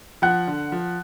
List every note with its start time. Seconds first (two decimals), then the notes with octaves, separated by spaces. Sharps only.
0.22 F3 F#5 F#6
0.47 D3
0.72 F3